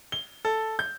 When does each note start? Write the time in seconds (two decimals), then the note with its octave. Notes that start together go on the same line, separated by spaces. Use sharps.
0.12 G7
0.45 A4
0.79 G6